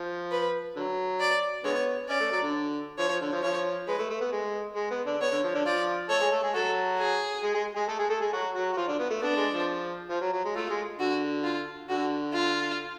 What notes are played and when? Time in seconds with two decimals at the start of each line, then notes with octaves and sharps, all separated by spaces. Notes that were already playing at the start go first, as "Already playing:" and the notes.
Already playing: F3
0.31 B4
0.76 D3 F#3
1.20 D5
1.64 D3 G#3 B3 C#5
2.09 C#4 D5
2.20 A3
2.31 F#3
2.42 D3
2.98 F3 C#5
3.09 F3
3.21 D3
3.32 F3
3.43 F3 C#5
3.87 G#3 B4
3.99 A3
4.10 A3
4.21 B3
4.32 G#3
4.76 G#3
4.91 B3
5.06 D3 D4
5.21 B3 C#5
5.32 D3
5.44 F3
5.54 D3 D4
5.65 F3 F4 D5
6.09 A3 A4 C#5
6.20 G#3 G#4
6.31 A3 A4
6.43 G#3 G#4
6.54 F#3 F#4 A4
6.98 G#4
7.43 G#3 G#4
7.54 G#3 G#4
7.76 G#3 G#4
7.88 A3 A4
7.99 G#3 G#4
8.10 A3 A4
8.21 G#3 G#4
8.33 F#3 F#4
8.55 F#3 F#4
8.73 F#4
8.77 F3 F4
8.88 D3 D4
8.99 B3
9.10 A3
9.21 B3 D4
9.36 G#3
9.52 F3
10.10 F3
10.21 F#3
10.33 F#3
10.44 G#3
10.55 A3 F4
10.70 G#3
10.99 D3 F#4
11.44 F4
11.89 D3 F#4
12.33 F4